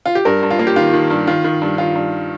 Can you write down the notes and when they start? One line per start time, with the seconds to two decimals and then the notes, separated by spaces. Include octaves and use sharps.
0.06 F4
0.15 G4
0.25 G2 A#4
0.42 G2
0.51 F4
0.59 A#3
0.67 G4
0.76 D#3 F4
0.94 D#3
1.10 G2
1.27 D#3 F4
1.44 D#3
1.62 G2
1.78 D#3 F4
1.95 G2